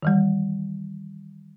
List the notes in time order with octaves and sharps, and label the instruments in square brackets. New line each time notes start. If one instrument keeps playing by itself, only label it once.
[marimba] D#3 E3 G3